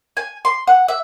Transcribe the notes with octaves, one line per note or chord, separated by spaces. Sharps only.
G#5
C6
F#5
E5